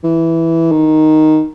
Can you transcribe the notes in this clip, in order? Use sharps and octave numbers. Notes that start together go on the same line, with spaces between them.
E3
D#3